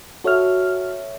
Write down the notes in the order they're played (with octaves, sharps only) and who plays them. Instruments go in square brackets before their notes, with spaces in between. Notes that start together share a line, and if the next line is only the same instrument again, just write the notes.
[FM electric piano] F#4 F6 [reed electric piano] A4 C#5 E5